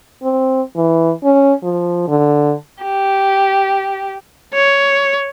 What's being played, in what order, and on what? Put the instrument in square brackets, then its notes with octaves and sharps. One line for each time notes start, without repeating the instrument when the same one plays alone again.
[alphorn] C4
E3
C#4
F3
D3
[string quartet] G4
[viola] C#5